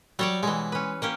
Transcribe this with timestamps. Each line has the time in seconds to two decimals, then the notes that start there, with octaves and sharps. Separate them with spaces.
0.19 F#3 G3 C#5 D5
0.43 B2 E3 G#3
0.72 C#4 B4
1.02 A#3 C#4 G4